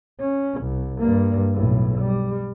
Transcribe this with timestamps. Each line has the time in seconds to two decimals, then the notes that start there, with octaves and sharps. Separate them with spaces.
0.20 C#4
0.61 C2
0.99 G2 A#3
1.53 B1 A2
1.99 G3